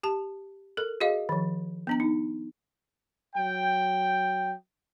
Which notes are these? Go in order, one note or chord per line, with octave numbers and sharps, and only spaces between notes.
G4 A5
A4 A#4
F#4 G#4 D#5 F5
D#3 F3
B3 D4 A#5
D#4
F#3 G5